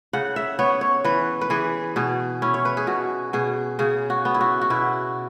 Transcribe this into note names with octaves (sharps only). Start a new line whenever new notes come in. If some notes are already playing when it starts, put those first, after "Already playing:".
C#3 F#5
E5
B3 C#5
C#5
E3 B4
B4
E3 G#4
B2 G#4
C#4 E4
C#5
B4
G#4
B2 F#4
B2 G#4
C#3 G#4
F#4
B3
E4
F#4
F#4
B2 E4